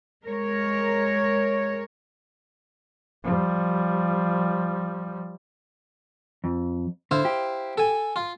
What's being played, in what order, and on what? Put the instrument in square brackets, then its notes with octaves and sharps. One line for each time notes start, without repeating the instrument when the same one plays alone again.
[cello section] G#3 A#4 C#5
[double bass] F3 G3
[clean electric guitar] F2
[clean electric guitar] D3 [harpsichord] E4 C5 F5
[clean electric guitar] G4
[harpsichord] A4 G#5
F4